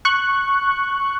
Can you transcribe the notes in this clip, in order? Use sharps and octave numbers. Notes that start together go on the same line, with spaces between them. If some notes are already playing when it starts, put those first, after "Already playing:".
C#6 F#6